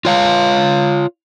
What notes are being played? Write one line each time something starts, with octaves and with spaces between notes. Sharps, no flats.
F4 C#5 F5